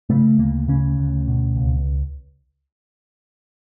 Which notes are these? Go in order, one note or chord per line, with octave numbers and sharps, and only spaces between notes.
C#3 A3
D2 A#3
C#3 C#4
D2
B2
C#2